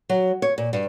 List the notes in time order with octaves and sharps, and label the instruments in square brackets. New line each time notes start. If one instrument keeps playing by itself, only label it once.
[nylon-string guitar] F#3
C#5
A#2
G2